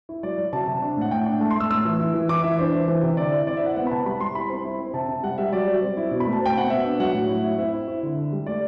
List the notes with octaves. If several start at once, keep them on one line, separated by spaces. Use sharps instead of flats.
E4
F#3 D5
F#3
C3 A5
C3
D4
A2 F#5
A2 G5
D4
A3 A5
C6
A3 E6
A2 E6
E3
E4
E3
E4 D6
E3 E5
D4 C5
E3
E3
C3
D3 D5
E4
C4 D5
E5
E4 F#5
B3 F#5
B5
C3 A5
G3 B5
G3 C6
E4 B5
C4
E4
C4
C3 A5
C3
G3 F#5
G3 E5
F#3 D5
F#3
C4
E4
B2
B5
A3
A5
C4 G5
B2 F#5
B3 E5
D4
F#3 F#5
A2
E4
E4
C4 E5
E4
E4
D3
D3
G3
A3 D5